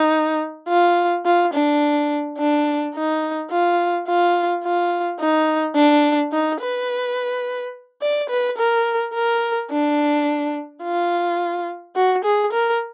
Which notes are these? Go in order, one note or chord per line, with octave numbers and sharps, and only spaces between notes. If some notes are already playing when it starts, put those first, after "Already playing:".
Already playing: D#4
F4
F4
D4
D4
D#4
F4
F4
F4
D#4
D4
D#4
B4
D5
B4
A#4
A#4
D4
F4
F#4
G#4
A#4